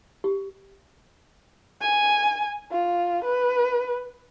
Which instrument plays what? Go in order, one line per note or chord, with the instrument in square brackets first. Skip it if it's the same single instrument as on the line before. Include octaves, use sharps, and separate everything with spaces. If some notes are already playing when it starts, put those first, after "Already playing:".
[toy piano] G4
[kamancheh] G#5
F4
B4